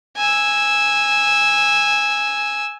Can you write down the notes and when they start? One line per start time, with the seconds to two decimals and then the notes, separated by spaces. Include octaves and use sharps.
0.17 G#5 E6